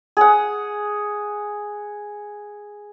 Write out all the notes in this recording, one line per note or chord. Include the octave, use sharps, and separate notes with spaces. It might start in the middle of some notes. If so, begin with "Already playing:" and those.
G#4 F#5